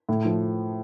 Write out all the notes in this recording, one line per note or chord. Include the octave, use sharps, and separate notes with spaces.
A2
F3